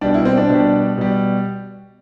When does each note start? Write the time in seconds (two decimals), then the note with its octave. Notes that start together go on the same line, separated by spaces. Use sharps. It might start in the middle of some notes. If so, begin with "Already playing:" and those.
0.01 B2 G3 D4
0.14 E4
0.25 C4
0.37 D4
0.50 B2 G3
0.98 B2 G3